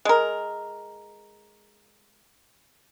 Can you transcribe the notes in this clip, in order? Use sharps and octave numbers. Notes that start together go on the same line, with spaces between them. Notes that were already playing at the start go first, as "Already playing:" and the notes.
G#3 A#4